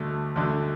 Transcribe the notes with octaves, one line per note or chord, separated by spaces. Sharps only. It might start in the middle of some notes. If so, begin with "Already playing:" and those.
Already playing: D2 D3 A3
D2 D3 A3